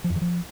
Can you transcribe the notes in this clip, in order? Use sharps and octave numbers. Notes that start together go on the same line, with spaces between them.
F3
F2
E3
F3